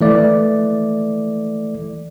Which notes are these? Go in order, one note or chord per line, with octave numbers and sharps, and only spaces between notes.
E3 A3 D5